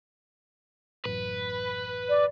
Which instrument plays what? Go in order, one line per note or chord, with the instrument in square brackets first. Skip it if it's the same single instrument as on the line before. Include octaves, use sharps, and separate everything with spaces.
[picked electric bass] A1 F#2 [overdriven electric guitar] B4
[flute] D5